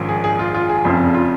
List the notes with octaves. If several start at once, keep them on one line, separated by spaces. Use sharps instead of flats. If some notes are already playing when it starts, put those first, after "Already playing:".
Already playing: A#1 G#2 D#3 C#4 F4
G#4
G#4
F4
F4
G#4
F1 F2 C#3 F4
F4